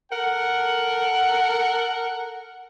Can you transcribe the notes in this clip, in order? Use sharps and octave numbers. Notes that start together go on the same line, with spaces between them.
A4 A#4 F#5